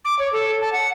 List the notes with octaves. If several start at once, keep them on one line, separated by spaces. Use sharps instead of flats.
D6
C#5
A4
A5
F#5